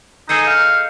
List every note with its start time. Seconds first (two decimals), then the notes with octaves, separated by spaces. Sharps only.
0.29 D#4 G#4 A4 D#5 G6 C7 C#7
0.47 F5